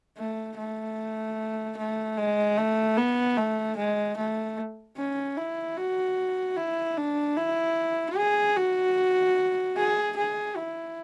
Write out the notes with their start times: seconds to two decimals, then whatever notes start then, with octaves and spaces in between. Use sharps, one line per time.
0.18 A3
0.58 A3
1.77 A3
2.17 G#3
2.57 A3
2.97 B3
3.37 A3
3.77 G#3
4.17 A3
4.97 C#4
5.37 E4
5.77 F#4
6.57 E4
6.97 D4
7.37 E4
8.17 G#4
8.56 F#4
9.77 G#4
10.16 G#4
10.57 E4